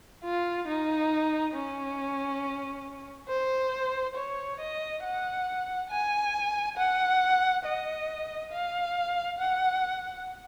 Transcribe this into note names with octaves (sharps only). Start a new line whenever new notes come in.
F4
D#4
C#4
C5
C#5
D#5
F#5
G#5
F#5
D#5
F5
F#5